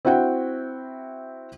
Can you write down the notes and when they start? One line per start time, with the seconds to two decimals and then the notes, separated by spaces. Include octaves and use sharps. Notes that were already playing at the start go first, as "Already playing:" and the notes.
0.05 C4 E4 F#4 F#5 G5